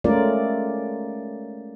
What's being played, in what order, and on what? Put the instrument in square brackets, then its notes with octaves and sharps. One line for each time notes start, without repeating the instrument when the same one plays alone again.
[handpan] G#3 A3 C#4 F4 A#4 D5